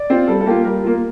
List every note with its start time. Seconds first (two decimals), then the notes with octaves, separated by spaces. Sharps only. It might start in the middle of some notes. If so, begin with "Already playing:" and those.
Already playing: D5
0.10 C4 F4
0.28 G3 A4
0.41 A4
0.46 A#3 F4 G4
0.65 G3 A#4
0.84 A#3 F4